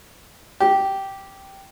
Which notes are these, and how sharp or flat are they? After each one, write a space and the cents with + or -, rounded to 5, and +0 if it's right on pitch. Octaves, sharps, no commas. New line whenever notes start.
G4 -10